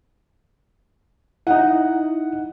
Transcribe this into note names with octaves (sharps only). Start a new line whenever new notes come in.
D#4 E4 F#5